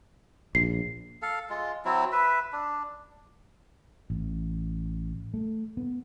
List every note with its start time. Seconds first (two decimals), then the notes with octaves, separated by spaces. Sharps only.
0.55 A#1 C7
1.22 A4 F5
1.50 G#3 F4
1.85 F#3 C4 E4
2.12 B4 E5
2.53 D4
4.10 A1
5.34 A3
5.77 B3